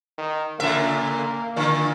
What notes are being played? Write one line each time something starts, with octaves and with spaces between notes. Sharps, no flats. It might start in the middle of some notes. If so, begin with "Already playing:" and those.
D#3
A#2 C#3 A#3 E5
A#2 D3